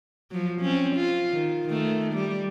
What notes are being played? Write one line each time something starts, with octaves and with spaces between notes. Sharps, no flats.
F3 F#3
C4 C#4
F4
D#3
D#3 A3
G3